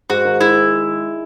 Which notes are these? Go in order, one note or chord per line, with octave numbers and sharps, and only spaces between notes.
G#2 F#4
D#3
G#3 E4